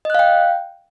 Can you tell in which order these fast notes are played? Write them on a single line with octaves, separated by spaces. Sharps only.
D#5 F#6 F5 G5